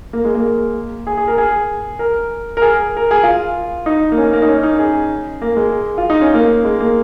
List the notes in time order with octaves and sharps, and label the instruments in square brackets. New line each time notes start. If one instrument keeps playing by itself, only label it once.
[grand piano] A#3
G#3
A#3
G#4
G#4
A#4
G#4
A#4
A#4
G#4
A#4
G#4
F4
D#4
A#3
C#4
A#3
D#4
C#4
D#4
G#4
A#3
G#3
F4
D#4
C#4
A#3
G#3
A#3